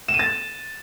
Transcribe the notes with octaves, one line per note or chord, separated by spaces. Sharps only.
E7
D#7
A6